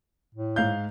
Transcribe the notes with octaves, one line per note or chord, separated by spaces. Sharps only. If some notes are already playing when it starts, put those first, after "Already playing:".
A2
G#2 F5 G6